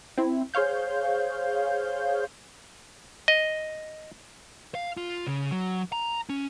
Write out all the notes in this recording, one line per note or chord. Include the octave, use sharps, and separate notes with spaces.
C4 E4
G#4 C5 C#5 F5 G6
D#5
F5
F4
C#3
F#3
A#5
C#4